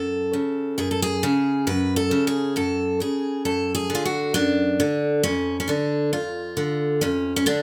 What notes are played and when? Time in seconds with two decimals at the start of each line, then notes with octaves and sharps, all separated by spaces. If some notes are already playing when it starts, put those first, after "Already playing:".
Already playing: F#2 A4
0.33 C#3
0.78 F#2 G#4
0.91 A4
1.02 G#4
1.23 C#3
1.67 F#2 B4
1.96 A4
2.11 C#3
2.27 G#4
2.56 F#2 A4
3.00 C#3 G#4
3.45 F#2 A4
3.75 G#4
3.90 D3
3.95 F4
4.05 F#4
4.34 F#2 D4
4.80 D3
5.23 F2 C#4
5.60 C#4
5.68 D3 D4
6.13 F2 F4
6.57 D3
7.01 F2 C#4
7.36 C#4
7.46 D3 D4